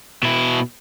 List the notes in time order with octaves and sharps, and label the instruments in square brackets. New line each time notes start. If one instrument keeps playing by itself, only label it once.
[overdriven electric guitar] B2 E4